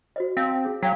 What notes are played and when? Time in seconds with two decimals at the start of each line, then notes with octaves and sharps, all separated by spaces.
0.16 F#4 C5 D#5
0.37 C4 F5 A5
0.65 G#4
0.83 F#3 F5 G5